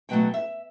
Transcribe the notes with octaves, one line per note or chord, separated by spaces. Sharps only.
B2 F#3 A3 G5
E5